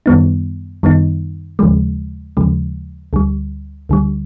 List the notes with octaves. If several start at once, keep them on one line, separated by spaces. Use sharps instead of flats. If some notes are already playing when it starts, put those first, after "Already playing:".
F#2 D#3 G3 B3 D#4
F#2 D#3 G3 B3 D#4
D#2 C#3 F3 G#3
D#2 C#3 F3 G#3
D2 D3 G3
D2 D3 G3